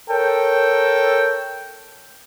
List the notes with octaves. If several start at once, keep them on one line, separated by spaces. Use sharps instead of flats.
A4 A#4 C#5 G5